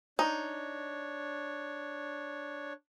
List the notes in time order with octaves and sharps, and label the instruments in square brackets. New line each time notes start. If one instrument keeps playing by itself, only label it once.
[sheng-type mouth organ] D4 C#5 [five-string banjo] D#4